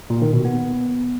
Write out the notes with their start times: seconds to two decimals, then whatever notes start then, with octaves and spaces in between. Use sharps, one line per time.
0.10 A#2
0.22 D#3
0.33 B2
0.45 B3